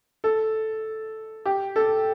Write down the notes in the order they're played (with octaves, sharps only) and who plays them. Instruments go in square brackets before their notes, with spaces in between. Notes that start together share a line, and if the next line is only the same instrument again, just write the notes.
[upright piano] A4
G4
A4